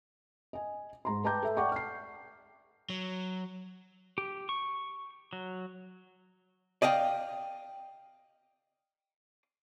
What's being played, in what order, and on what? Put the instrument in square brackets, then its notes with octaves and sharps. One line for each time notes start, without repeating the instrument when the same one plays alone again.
[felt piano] D#5 G#5
G#2 A#5 C6
B4 G5 A5 A#5 D6 G6
A4 E5
D5 F#5 G5 A5 C#6 D6
F6 C7
[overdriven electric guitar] F#3
[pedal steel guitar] G4
C#6
F#3
[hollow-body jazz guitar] D5 D#5 F5 G5